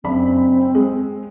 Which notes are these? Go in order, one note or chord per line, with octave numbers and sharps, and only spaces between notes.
F#1 C4 D4 B5
G#3